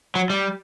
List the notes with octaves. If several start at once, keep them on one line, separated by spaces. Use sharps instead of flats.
F#3
G3